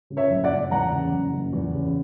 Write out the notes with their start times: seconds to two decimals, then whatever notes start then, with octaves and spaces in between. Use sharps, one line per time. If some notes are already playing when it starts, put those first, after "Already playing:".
0.10 C#3
0.17 C#5 E5
0.30 F#1
0.44 D5 F#5
0.51 F#1
0.71 E2 F#5 A#5
0.92 C#3
1.13 F#1
1.33 F#1
1.53 E2
1.74 C#3